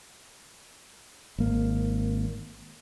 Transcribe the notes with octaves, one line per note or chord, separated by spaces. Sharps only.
G#1 A#3